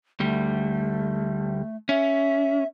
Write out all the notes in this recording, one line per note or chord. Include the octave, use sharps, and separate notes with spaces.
D2 G3 A3
C#4 E5